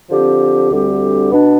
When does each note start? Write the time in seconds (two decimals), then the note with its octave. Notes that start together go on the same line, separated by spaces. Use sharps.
0.10 D3 F3 C4 G4
0.71 D2 D3 G3 C4 G4
1.32 B2 B3 D4